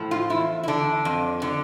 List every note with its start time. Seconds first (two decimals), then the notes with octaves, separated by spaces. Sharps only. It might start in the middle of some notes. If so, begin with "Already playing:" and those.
Already playing: A2 F3
0.11 F4
0.30 E2 E4
0.63 E4
0.68 D3 D4
1.05 F2
1.42 D3